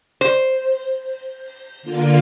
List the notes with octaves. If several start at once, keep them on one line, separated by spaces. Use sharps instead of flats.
C5
D3 A#3 F4